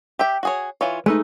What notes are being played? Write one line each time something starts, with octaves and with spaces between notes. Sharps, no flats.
G4 E5 G5
F#4 G#4 C#5
E3 F4 C#5
G#3 A3 D#4 B4